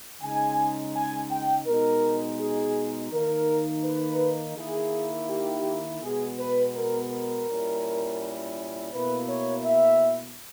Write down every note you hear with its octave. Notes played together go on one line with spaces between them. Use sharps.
C#3 G#3 D#4 G#5
G#5
G5
B2 G#3 D#4 A#4
G#4
D#3 A#3 D#4 A#4
B4
D#3 A#3 E4 G#4
G4
B2 G#3 B3 G#4
B4
A#4
A#4
A#2 G3 C#4 E4
B2 A#3 E4 B4
C#5
E5